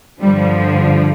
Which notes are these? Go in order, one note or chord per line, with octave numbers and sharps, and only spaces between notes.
G2 D3 F3 G3